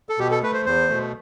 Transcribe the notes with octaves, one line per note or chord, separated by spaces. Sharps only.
A4
B2 G4
A4
A3 B4
C5
E2 C5
B2 A3